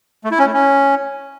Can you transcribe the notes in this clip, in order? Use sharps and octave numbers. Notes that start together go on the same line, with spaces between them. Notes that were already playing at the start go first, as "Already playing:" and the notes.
A3
E4
C#4
A3
C#4